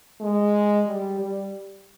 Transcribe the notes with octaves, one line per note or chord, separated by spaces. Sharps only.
G#3
G3
G3